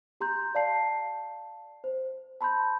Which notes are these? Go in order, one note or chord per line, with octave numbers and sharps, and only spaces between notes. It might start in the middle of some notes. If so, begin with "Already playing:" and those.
G4 A#5 C6 G6
D5 F5 A5 C7
C5
A5 B5 C6 G6